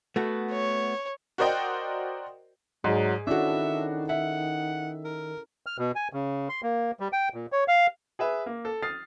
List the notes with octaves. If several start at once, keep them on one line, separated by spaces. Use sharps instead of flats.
A3 B3 F#4
C#5
F#4 A#4 C5 D5 D#5 G5
G#2 F#3 G#4 D5
D#3 C#4 D4 E4 F#4 A4 E5
E5 F#5
A#4
F6
B2
G#5
C#3
C6
A#3
G3
G5
A#2
C#5
F5
G#4 B4 E5
A#3
A4
D#6 F6 A6 C7